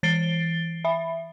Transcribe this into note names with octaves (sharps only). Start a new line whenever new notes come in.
E3 A6 C7 D7 G7
E5 B5